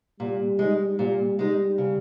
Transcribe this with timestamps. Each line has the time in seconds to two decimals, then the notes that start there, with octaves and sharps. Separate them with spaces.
0.20 A#2 G3
0.59 G#3 D#4
0.99 A#2 G3
1.38 G3 G#3 D#4
1.78 C#3